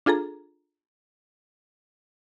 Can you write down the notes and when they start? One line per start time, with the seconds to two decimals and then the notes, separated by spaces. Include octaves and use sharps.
0.06 D4 F4 G#4 A4 A#5